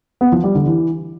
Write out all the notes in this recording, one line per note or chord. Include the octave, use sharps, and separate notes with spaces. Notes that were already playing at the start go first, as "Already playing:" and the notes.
B3
F3
G3
D3
E3